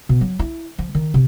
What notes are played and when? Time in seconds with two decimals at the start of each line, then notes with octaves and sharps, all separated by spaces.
0.09 B2
0.21 F#3
0.39 E4
0.78 F3
0.95 D#3
1.14 C3